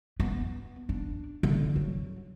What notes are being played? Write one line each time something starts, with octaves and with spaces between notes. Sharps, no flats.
B3
D4
D3
F#3